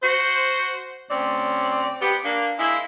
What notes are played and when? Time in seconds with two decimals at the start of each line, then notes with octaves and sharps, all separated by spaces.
0.02 F#4 C5
1.09 D2 C4 C#4 D5
2.00 B3 G4
2.24 A#3 D4
2.58 G#3 A#3 E4